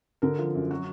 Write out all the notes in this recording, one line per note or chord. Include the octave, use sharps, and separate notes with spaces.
D3 A#4
F3
F#2
F#3 F#4